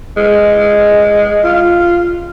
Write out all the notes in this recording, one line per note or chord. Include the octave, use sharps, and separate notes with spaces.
G#3
F4